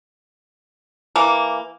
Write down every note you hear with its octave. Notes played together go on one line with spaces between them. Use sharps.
E3 A#3